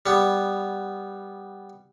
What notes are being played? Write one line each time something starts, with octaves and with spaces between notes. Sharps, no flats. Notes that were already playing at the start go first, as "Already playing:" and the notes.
G3 B3